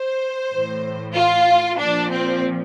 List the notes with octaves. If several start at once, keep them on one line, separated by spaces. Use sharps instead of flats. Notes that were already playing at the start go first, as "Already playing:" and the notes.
Already playing: C5
A2 E3
F4
A#2 F3 D4
C4